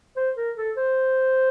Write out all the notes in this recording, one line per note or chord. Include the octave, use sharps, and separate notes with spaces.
C5
A#4
A4
C5